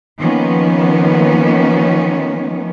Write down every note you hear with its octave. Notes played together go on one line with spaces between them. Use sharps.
D#3 F3 A#3 B3 C#4